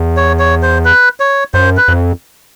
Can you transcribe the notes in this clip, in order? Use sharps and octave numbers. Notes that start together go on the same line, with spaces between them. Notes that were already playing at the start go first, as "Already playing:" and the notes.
Already playing: E2
C#5
C#5
C5
B4
C#5
F#2 C5
B4
F2